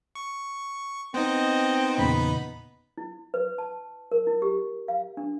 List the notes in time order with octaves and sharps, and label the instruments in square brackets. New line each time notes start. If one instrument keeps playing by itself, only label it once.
[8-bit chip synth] C#6
[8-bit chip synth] B3 D#4 [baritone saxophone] C4 [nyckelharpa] D#5
[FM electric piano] E2 A#2 C#3 [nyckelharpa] B5
[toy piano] E4
B4
A5
A#4
E4
G4
F5
D4